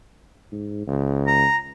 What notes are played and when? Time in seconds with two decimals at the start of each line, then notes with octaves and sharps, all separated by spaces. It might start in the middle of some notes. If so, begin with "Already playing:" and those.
0.52 G#2
0.87 C#2
1.27 A#5